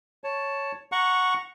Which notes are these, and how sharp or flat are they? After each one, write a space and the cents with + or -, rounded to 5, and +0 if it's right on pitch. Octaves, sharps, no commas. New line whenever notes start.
C#5 +0 A5 +0
F#5 -10 A#5 +0 C#6 +0